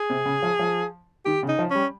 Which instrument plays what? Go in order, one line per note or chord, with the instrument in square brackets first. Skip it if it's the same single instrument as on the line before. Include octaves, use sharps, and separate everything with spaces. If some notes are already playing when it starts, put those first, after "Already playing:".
Already playing: [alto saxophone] G#4
[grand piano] C3
C#3
F3
F3
[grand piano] D#3 [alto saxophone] G4
[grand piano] C#3
[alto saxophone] D#4
[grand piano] F3
[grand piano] G3 [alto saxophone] C#4